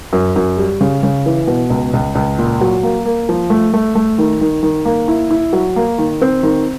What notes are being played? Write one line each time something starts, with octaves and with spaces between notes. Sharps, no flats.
F#2
F#2
G3
C#3
C#3
E3
B2
C#2
C#2
C#2
A#2
F#3
A#3
A#3
F3
A3
A3
A3
D#3
D#3
D#3
A#3
E4
E4
F#3
A#3
D#3
C4
D#3